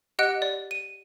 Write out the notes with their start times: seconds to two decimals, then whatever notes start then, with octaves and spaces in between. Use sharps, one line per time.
0.19 G4 D#5 F#5 F#6 D7
0.42 D5
0.71 D#7